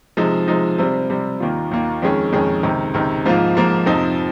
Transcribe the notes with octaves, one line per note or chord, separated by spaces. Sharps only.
C3 F3 G#3 D#4
C3 F3 G#3 D#4
C3 G3 C4
C3 G3 C4
D#2 D#3 A#3 F4
D#2 D#3 A#3 F4
F2 D#3 G#3 C#4 G#4
F2 D#3 G#3 C#4 G#4
C#2 C3 D#3
C#2 C3 D#3
G#2 F3 A#3 F4
G#2 F3 A#3 F4
F2 C3 F3 C4 D#4